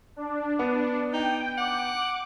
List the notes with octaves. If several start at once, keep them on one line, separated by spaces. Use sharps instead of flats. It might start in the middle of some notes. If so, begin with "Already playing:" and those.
D4
B3
D#4 G5
F#5 D6